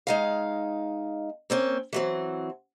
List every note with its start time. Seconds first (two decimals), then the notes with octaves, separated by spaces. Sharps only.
0.07 G#3 D#4 F5
1.50 A#3 C4 C#4
1.93 E3 F#3 C4